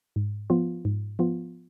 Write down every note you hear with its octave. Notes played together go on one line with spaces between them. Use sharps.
G#2
F3 B3 F4
G#2
F3 B3 F4